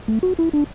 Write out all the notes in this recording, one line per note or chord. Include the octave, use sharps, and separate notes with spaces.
A3
F#4
E4
D4